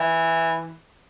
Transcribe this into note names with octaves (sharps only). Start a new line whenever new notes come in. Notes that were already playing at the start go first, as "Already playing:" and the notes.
Already playing: E3